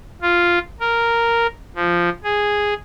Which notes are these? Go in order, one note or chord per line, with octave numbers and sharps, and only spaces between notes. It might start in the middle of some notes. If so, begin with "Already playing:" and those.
F4
A#4
F3
G#4